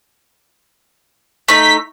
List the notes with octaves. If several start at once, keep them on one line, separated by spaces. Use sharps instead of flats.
A3 D#4 B6